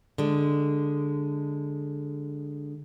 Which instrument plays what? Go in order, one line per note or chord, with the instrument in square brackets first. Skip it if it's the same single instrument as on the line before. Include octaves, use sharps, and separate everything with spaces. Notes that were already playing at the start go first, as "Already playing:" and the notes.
[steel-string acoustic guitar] D3 G#3